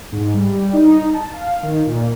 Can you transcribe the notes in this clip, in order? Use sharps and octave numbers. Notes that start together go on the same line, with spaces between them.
G#2
G3
D#4
A5
F5
D#3
A#2